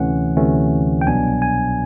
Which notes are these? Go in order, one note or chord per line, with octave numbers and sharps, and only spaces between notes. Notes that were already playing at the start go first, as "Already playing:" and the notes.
Already playing: D2 C3 E3 A3 C#4 F#5
D2 C3 E3 A3 C#4
G5
C2 B2 F#3 B3 D4 G#5
G#5